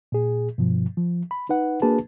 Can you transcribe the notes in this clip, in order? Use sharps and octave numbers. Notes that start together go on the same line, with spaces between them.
A#2 G#4
G2 B2 F3
F3
B5
D#4 B4 F#5
A#3 D4 F#4 G#4 B4 A5